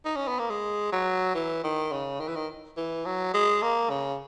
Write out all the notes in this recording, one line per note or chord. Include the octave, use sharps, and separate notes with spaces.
D#4
C#4
B3
A#3
G#3
F#3
E3
D#3
C#3
D#3
E3
D#3
E3
F#3
G#3
A#3
C#3